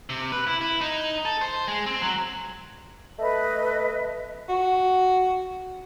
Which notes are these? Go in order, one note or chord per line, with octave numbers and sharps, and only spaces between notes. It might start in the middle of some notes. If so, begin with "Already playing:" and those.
C3
B4
E4
E4
D#4
A4
C5
G#3
C4
F#3
A3 B4 D#5
F#4